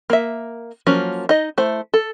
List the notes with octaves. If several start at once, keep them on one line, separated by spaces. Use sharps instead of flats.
A#3 E5
F3 F#3 A#3 C#4
D#4 D#5
A3 E4 C5
A4